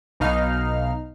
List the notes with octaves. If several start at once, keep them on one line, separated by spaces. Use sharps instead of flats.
B1 B2 D#4 F5 F6